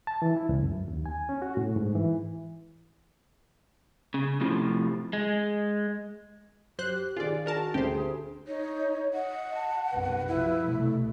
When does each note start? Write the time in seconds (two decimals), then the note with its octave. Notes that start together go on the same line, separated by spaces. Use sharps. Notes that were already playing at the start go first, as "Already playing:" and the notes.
0.07 A5
0.22 E3
0.37 E4
0.49 C#2
0.63 F#2
0.88 D#2
1.06 G#5
1.29 C#4
1.42 F#4
1.57 A2
1.76 G#2
1.95 E3
4.14 C#3
4.41 A2 C3 F3
5.13 G#3
6.78 F#2 G4 C5 F#6
7.16 D#3 F4 G#4 D5
7.46 D4 F#4 A#4 A5
7.74 D2 G4 G#4 C5
8.47 D#4 C#5
9.14 D#5 F#5
9.55 A5
9.92 B1 F#2 C3 B4
10.28 B1 C3 F3 E4
10.65 C2 B2 A3